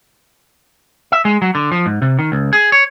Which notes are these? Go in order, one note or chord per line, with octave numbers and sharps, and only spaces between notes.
E5
G#3
F#3
D3
F3
G#2
C3
D#3
C#2
G#4
C#5